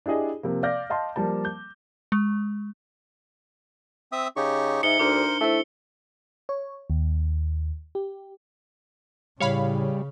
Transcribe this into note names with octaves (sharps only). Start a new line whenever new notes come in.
D4 E4 G4 G#4 D#5
C3 F3 A#3
D5 F5 D6 F6 G6 A#6
D#5 F5 A5 C6
F3 G3 A#3 A5
G6
G#3
C4 E5 D#6
C#3 D#4 G4 C#6
G#2 D#4 E5 C#7 G7
D2 D4 A#4 C5
A3 E4 C5
C#5
D#2
G4
A2 C#3 G3 C#5 F5 B5